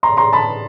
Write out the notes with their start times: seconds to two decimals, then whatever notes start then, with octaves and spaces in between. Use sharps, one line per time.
0.03 A#5 C6
0.17 A#5 C6
0.33 A5 B5